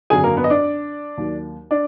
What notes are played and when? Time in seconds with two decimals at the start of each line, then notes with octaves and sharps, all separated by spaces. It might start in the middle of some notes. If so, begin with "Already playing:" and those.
0.10 G#1 F#2 D3 F#3 G#4 G#5
0.24 A#3 A#4
0.37 B3 B4
0.44 D#5
0.50 D4 D5
1.17 D#2 D#3 F#3
1.71 D4 D5